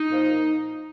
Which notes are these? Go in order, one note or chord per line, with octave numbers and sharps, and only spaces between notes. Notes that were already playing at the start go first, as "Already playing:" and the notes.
Already playing: D#4
A#2 F3